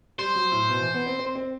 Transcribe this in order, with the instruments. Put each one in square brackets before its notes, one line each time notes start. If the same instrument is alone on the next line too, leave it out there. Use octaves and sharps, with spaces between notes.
[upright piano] G3 [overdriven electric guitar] C5
[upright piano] F#3
A2
B2
E3
B3
C4
C4
C4